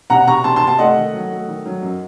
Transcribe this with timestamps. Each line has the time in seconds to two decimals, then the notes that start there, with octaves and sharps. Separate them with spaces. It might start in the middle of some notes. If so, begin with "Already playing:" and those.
0.10 C3 F#5 A#5
0.27 C3 A#5 C#6
0.44 C3 A5 C6
0.56 A5 C6
0.62 C3
0.67 A5 C6
0.79 A3 D#5 F#5
0.96 D#3
1.14 F#3
1.31 A3
1.48 D#3
1.65 F#3
1.82 F#2